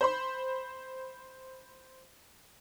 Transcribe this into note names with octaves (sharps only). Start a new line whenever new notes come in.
C5 B5 C6